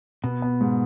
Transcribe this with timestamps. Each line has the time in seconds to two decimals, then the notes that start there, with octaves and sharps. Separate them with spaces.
0.24 B2 B3
0.42 B3
0.60 G#2